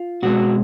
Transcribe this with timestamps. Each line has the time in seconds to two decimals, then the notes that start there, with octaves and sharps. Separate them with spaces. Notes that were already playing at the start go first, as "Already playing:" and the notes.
Already playing: F4
0.23 B2 G#3 C4 F#4